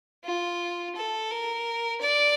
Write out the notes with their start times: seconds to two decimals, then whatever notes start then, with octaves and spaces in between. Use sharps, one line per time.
0.24 F4
0.96 A4
1.31 A#4
2.01 D5